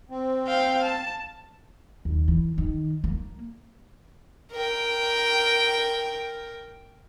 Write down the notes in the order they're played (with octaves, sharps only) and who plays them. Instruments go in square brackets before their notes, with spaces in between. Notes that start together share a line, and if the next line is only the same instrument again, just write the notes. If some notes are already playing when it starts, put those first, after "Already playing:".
[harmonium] C4
[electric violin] F5 G5
A5
[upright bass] D#2
E3
D#3
A#3
[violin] A#4 G5